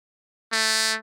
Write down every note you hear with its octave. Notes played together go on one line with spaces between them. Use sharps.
A3